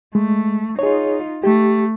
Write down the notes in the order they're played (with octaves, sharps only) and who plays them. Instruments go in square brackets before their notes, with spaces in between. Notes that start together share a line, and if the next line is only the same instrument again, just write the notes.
[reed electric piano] G#3 [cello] A3
[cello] D#4 F4 [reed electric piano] G#4 C#5
[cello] A3 [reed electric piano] G4